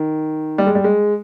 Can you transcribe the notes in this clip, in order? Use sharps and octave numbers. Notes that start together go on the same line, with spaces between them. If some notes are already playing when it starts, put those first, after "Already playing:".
Already playing: D#3
G3
G#3
G3
G#3